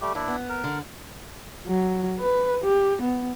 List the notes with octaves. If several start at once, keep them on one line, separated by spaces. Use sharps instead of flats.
G3 A3 G4
D#2 D4 E4
B3
A#4
D3
F#3
B4
G4
B3